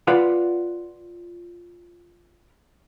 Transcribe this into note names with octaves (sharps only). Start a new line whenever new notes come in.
F4 B4 D5 F5 F#5